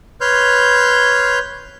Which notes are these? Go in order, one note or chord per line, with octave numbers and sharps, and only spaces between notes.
B4 C#5 C6 F6 G6